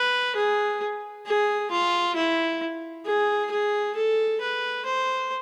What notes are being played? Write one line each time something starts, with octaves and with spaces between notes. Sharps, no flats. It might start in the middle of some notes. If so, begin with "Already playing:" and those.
Already playing: B4
G#4
G#4
F4
E4
G#4
G#4
A4
B4
C5